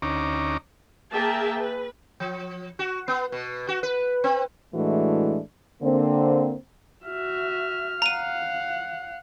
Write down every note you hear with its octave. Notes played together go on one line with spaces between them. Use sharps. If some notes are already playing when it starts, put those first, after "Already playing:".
D2 C#4 D#4 A#5 D6
A#3 G#4 A#4 E5 G5 A5
B4
F3
F#4
B3
B2
F#4
B4
C4
A2 E3 G#3 A3 D4 F#4
D3 A#3 C4
F#4 E5 F6
F5 F#5 A#5 D#7